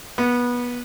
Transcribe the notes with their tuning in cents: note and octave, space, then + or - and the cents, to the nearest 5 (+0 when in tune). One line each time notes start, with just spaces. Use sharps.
B3 -20